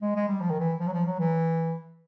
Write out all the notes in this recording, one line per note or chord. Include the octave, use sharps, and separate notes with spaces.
G#3
G#3
G3
F3
D#3
E3
F3
F#3
F3
F#3
E3